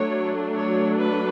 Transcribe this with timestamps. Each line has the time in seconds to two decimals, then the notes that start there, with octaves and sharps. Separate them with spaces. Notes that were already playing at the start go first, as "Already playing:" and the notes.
Already playing: F#3 A3 D4 C#5
0.54 C#5
0.98 B4